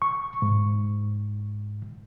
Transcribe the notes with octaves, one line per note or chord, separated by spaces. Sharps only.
C#6
G#2